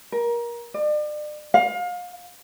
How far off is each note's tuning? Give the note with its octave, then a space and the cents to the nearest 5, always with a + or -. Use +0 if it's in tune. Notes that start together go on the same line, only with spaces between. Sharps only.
A#4 +25
D5 +40
F5 +30